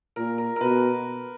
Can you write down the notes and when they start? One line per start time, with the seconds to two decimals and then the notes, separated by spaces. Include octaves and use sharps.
0.16 A#2 A#4
0.38 A#4
0.56 A#4
0.61 B2 B4